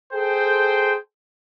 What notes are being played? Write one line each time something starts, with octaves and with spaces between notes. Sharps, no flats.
G#4 A4 C5 G5